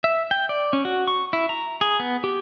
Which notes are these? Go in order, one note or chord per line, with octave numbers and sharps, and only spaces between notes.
E5
G5
D5
C#4
F#4
C#6
E4
A#5
G#4
B3
G4